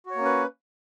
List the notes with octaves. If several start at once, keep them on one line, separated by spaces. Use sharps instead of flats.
A#3 C#4 F#4 B4 C#5